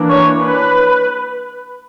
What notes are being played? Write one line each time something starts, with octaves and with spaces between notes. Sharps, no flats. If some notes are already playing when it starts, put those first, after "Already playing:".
Already playing: E3 A#3 D4
C#5
B4